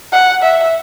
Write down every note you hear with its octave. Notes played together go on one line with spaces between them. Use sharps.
F#5
E5